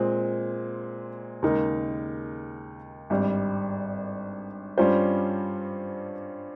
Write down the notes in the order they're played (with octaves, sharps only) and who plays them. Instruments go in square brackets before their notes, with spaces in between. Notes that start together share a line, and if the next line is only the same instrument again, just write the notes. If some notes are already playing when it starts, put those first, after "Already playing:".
Already playing: [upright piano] A#2 G#3 C4
D#2 C#3 G#3 D#4 A#4
G#1 G2 G3
G2 G3 C#4 F4 C5